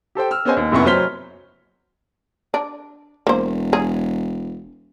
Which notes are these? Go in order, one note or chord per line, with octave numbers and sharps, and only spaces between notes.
G4 A4 C5 G5
E6 F6
B3 C#4 G#4 C5 D#5 G#5
D#2
F1 C2 F#2 B3 E4 C#6
F#1 F#3 C5 F6 B6 G7
D4
E1 A#3 C5
G#4